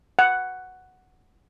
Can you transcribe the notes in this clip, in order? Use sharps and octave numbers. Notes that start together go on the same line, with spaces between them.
F#5